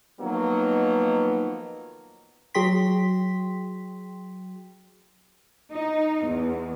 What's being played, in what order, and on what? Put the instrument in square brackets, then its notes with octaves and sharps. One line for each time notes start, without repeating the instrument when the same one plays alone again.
[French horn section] D#3 F3 F#3 A#3 B3 D#4
[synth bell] F#3 F#4 G#4 G5 C6 B6
[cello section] D#4
E2